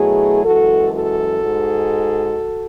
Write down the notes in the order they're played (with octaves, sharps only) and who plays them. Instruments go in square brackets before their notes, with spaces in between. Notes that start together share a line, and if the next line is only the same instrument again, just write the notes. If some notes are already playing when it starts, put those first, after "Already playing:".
Already playing: [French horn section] B2 F#3 A3 E4 G#4
F#2 E3 G#3 F#4 A4
F#4 A4
G#2 G#3